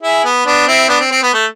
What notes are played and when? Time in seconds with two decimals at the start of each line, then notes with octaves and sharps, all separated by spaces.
0.02 E4 G#4
0.25 B3
0.46 B3 D4
0.67 C4 E4
0.89 B3 D4
1.00 C4
1.11 C4
1.23 B3
1.34 A3